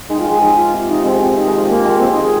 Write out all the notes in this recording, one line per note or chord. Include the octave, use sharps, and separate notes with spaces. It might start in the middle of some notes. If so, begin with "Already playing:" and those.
D#3 G#3 D#4
F3 F4
D#3 G#3
G#4
F3 D#4
F4
C3
F3 D#4
D#3 G#3 C4
F3 C4
D#3 D#4
D#3 G#3
F3
D#3 A#3
D#3 G#3
F3 C4
D#4
D#3
G#4